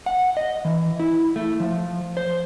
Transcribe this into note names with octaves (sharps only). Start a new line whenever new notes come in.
F#5
D#5
E3
E4
A3
F3
C5